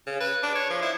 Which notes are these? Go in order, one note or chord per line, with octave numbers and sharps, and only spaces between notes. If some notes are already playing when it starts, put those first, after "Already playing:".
C#3
B4
D4
C#5
F3
E4